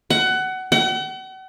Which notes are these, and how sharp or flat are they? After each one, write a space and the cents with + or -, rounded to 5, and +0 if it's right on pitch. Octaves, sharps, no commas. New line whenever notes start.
F#5 +20
F#5 +40